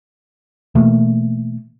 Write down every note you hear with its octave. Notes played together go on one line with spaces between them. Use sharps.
B2 E3 A3 A#3